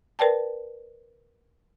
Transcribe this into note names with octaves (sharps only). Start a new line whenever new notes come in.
A#4 B4 D5 G5 A5